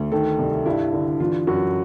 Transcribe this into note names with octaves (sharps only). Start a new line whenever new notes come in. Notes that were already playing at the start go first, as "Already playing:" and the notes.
Already playing: D2
D#3 A4
C2
G2 E4
D3
E3 F4
F#2 F#4